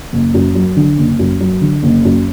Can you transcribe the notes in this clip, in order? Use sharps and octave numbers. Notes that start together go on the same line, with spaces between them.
F#1
F#2
F#3
D3
F#1
F#2
F#3
D3
F#1
F#2